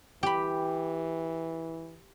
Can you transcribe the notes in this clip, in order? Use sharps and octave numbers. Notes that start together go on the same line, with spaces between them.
E3 G4 B5